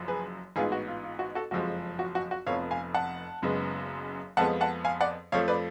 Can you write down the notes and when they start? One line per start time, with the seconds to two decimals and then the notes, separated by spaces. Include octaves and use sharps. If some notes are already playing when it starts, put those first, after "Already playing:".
Already playing: F#1 F#2 F3
0.08 G#4 B4
0.56 A1 G#2 G#3 B3 F4 G#4
0.72 F#4
0.88 F4
1.04 F4
1.19 F#4
1.35 F#4 A4
1.51 F#1 F2 F3 G#3 F#4
1.99 F#4
2.15 F#4
2.31 F#4
2.46 F1 F2 F3 B3 C#5 F5
2.71 F5 G#5
2.94 F#5 A5
3.42 F#1 F#2 C#3 G#3 B3
4.37 F2 F3 G#3 B3 F#5 A5
4.61 F#5 A5
4.84 F5 G#5
5.01 D5 F#5
5.32 F2 F3 A3 C#5 F5
5.48 B4 D5